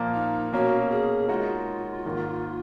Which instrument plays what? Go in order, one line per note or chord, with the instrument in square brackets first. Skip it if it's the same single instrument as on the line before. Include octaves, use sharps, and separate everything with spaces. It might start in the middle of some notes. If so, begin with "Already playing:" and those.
Already playing: [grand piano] A#2 F3 A#3
[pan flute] D#4
[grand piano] B2 A#3 C#4 [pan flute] F#4
[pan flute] G#4
[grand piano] G#3 D#4 F#4 A#4 C#5 [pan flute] F4
[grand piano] G#2 D#3 A#3